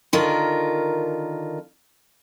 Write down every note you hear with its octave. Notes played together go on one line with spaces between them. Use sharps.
D3 D#3 F4 A#4